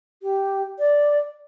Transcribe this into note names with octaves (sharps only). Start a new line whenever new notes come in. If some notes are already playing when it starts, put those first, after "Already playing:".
G4
D5